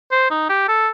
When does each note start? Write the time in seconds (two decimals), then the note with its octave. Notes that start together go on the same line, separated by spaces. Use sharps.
0.12 C5
0.30 D#4
0.49 G4
0.68 A4